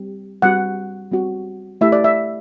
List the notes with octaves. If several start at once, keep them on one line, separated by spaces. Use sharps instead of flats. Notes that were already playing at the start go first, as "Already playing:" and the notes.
Already playing: G3 C4 G4
G3 C4 F#4 F#5
G3 C4 F#4
A3 E4 G4 E5
D5
E5